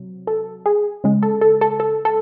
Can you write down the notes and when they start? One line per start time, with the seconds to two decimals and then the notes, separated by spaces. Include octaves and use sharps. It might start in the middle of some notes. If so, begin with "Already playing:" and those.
Already playing: C3 F#3
0.27 A4
0.66 G#4
1.04 C#3 G#3
1.23 A4
1.41 A4
1.61 A4
1.80 A4
2.05 A4